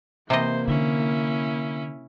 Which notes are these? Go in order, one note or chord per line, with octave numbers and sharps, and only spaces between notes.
C3 E3 A#3 C5 D#5
D3 C#4 E4